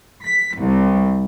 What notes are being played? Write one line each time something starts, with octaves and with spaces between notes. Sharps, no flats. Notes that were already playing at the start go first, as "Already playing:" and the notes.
B6
C2